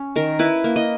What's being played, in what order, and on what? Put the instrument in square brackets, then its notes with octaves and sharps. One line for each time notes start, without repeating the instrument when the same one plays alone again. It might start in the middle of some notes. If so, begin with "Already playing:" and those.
Already playing: [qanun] C#4
D#3 A#4
E4 B4
A#3
D#5